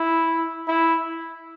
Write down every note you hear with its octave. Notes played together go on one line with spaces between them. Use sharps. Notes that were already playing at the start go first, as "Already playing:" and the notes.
Already playing: E4
E4